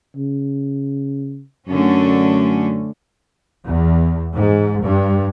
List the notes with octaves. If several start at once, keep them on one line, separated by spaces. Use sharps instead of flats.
C#3
F#2 D3 A3 C#4
E2
G#2
G2